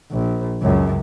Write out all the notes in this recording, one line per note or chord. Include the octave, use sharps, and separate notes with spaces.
A#1
C#2 F#2